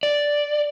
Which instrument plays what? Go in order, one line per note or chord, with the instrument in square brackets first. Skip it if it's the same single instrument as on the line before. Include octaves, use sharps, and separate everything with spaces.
[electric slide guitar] D5